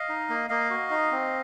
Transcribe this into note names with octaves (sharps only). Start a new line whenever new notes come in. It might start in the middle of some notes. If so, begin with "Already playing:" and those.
Already playing: D#5 F5
D#4
A#3
A#3 D#5 F5
F#4
D#4
C4